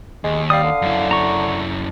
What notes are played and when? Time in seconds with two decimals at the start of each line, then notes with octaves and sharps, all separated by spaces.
0.24 D#2 G#3
0.50 G3 F5 D#6
0.64 D3
0.82 F#2 E4
1.11 A#5 C#6